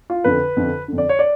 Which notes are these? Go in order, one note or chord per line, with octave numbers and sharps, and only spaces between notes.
F4
F2 D3 B4
F2 D3
F2 D3
D5
C#5
D5